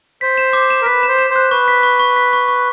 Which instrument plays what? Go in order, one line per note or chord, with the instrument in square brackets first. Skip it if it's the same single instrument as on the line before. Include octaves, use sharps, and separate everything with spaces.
[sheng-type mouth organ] C5 [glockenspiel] B6
[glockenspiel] E7
D6
E7
[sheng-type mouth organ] A#4
[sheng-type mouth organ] B4 [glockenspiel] B6
[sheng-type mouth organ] C5 [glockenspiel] E7
[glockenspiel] E7
[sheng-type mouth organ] C5
[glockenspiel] F#6
[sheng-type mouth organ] B4 [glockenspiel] C#6
[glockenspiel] B6
C#6
C#6
B6
C#6
C#6